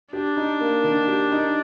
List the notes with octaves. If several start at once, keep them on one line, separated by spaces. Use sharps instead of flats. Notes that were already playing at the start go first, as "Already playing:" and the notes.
D4 G4
D#4
A#3
D#3
G4
D#4